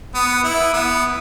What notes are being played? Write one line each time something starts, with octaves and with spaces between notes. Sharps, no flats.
B3
E4
B3